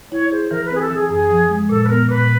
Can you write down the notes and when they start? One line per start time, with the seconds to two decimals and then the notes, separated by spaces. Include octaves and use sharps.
0.12 E4 C#5
0.31 G#4 C5
0.51 E3 A#4
0.65 B4
0.71 C4 G#4
0.81 A4
0.91 E3 G#4
1.10 F#2 G#4
1.30 F3
1.49 G#3
1.69 A#2 A4
1.85 B4
1.89 B3 A#4
2.09 A#2 B4